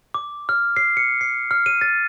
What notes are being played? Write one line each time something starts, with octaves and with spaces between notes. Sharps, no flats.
D6
F6
C7
C#7
C7
F6
D#7
A6